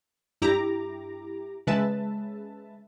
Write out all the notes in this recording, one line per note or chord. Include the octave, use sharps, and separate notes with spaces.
G2 E4 G4 A#5 D6
C#3 G#3 B4 E5 A5